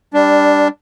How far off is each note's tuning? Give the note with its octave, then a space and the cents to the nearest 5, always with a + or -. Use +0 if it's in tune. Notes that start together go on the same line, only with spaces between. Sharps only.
G3 +15 D4 +0